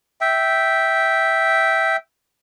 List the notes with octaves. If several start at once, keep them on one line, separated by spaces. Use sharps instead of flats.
E5 G5